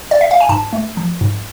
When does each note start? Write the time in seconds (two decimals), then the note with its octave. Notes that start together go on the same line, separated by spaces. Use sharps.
0.11 D5
0.21 E5
0.31 F5
0.40 G#5
0.49 G#2 A5
0.73 A3
0.97 F3
1.21 G#2